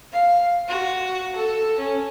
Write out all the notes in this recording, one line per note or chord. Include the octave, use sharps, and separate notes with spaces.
F5
F#4
A4
C#4